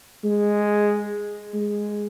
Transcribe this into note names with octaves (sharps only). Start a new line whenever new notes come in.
G#3
G#3